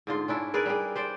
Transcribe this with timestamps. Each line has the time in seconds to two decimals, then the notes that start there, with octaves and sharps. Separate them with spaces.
0.07 G#2 D3 F4
0.28 C#4 D4 E4
0.54 G#4 A#4 B4 D5
0.66 G3 G4 G#4
0.96 G4 C5 D5